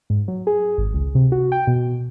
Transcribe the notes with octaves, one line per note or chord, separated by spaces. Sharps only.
G#2
F#3
G#4
G#1
C#2
C3
F#4
G5
B2